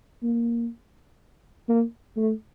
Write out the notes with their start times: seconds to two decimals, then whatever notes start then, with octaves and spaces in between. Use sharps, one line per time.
0.23 A#3
1.68 A#3
2.17 A3